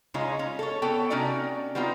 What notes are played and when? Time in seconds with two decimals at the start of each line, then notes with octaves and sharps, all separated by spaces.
0.14 C#3 G#3 C#4 D#4 F4
0.39 C#4
0.59 A4 C#5
0.82 B3 A4 C#5 G5
1.10 C3 C#4 D#4 F#4 D5
1.75 G3 B3 C4 D#4 F4